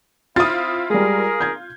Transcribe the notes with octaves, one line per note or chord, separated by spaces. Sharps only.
C4 E4 F4 D#6 A6
G3 G#3 G#4 A#4
G6 G#6